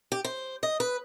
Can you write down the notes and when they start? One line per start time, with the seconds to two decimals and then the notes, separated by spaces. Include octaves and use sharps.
0.12 G4
0.24 C5
0.63 D#5
0.80 B4